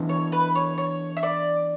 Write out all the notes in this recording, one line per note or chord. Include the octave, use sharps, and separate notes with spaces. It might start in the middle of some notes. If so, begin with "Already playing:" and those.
Already playing: E3 B3 D4
C#5
B4
C#5
C#5
E5
D5